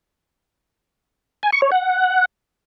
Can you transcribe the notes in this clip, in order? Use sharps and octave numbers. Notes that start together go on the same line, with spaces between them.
G#5
C#6
C#5
F#5